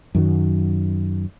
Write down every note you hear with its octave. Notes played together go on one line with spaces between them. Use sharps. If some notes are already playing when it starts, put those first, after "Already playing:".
F#2 D#3 F#3